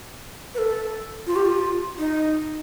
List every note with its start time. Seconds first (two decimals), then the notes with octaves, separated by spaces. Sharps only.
0.55 B4
0.58 A4
1.27 F4
1.36 G4
1.45 F4
1.99 D#4